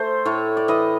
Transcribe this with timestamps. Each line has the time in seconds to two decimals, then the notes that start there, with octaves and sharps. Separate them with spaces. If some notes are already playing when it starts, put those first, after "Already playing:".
Already playing: A3 C5
0.25 A2 C#5
0.57 D5
0.68 E3 D#5